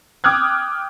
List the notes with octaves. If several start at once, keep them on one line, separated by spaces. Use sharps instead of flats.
G5 D6 D#6 F6 F#6 G#6